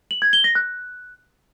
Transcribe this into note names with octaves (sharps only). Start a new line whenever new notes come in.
F#7
G#6
G7
A#6
F#6